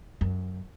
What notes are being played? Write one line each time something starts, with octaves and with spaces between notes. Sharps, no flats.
F#2